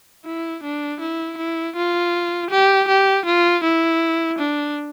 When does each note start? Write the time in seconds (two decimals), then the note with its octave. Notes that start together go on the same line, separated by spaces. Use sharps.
0.25 E4
0.63 D4
1.00 E4
1.38 E4
1.76 F4
2.50 G4
2.88 G4
3.26 F4
3.63 E4
4.39 D4